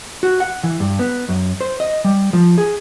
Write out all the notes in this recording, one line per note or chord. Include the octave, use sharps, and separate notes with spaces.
F#4
F#5
E3
G2
B3
F#2
C5
D#5
G3
F3
G#4